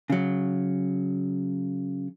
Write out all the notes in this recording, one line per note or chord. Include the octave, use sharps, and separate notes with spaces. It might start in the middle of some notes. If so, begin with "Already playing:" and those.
C#3 F#3